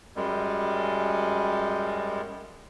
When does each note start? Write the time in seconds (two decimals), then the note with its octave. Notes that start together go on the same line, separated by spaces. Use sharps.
0.16 F#2 G3 G#3